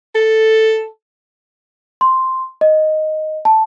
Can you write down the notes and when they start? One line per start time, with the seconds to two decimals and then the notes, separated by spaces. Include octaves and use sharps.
0.15 A4
2.01 C6
2.61 D#5
3.45 A5